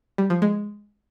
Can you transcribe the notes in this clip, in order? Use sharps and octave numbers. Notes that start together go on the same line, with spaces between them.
G3
F3
G#3